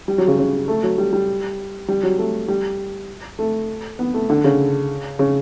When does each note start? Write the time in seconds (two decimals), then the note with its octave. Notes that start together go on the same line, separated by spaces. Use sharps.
0.08 G3
0.18 F#3
0.28 C#3
0.38 C#3
0.68 A3
0.83 F#3
0.98 G3
1.13 G3
1.88 G3
2.03 F#3
2.18 A3
2.48 G3
3.39 A3
3.99 B3
4.14 A3
4.30 D3
4.44 C#3
5.19 C#3